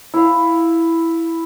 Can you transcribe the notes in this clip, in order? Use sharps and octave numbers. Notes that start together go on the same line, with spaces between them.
E4 F5